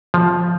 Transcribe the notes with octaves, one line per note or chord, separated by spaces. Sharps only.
F3